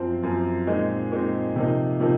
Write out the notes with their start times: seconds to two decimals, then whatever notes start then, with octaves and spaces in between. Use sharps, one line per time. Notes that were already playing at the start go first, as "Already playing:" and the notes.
Already playing: F#2 F3 C4
0.23 F#2 F3 C4
0.67 A#2 G#3 C4 D#4
1.11 A#2 G#3 C4 D#4
1.56 C3 F3 A#3 D#4
2.00 C3 F3 A#3 D#4